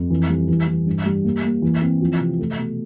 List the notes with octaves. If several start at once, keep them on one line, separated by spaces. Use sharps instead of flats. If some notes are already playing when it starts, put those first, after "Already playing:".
Already playing: F2
E3
G3
E3
E3
G2
G3
A#3
A#3
E3
C4
F3
C3
A3
B2